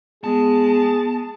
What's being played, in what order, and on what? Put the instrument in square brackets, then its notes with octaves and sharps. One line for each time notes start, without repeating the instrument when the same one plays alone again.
[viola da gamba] G#3 [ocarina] B3 [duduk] G#4 [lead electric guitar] A5